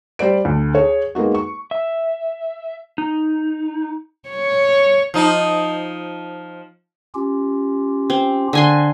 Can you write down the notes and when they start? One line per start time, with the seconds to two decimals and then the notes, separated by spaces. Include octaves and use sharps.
0.19 G3 C5 D5 D7
0.45 D2
0.75 G#4 C#5
1.15 G#3 A#3 B3 D#4 F#4
1.35 C#6
1.71 E5
2.98 D#4
4.29 C#5
5.14 F3 D#4
7.15 C#4 F4 G4
8.10 C4
8.53 D3 G#5 C6